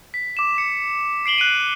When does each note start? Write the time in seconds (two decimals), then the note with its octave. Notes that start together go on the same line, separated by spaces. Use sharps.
0.14 B6
0.37 D6 E7
0.58 C#7
1.26 C7 D7 F#7 G7
1.38 F#6 D7 D#7